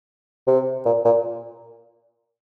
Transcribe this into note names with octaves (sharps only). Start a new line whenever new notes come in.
C3
A#2
A#2